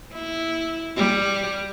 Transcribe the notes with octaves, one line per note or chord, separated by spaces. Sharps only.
E4
G3